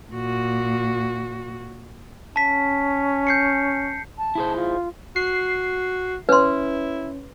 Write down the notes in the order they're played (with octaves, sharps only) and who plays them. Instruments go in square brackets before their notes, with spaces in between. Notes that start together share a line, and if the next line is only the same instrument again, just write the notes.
[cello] A#2 F#4
[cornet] C#4 [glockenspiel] A5 B6
[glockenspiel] G6 C7 C#7
[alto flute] A5
[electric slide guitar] E4 G#4 C5
[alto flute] F4
[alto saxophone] F#4 [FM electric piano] C7
[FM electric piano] C#4 [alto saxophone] E4 [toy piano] B4 C6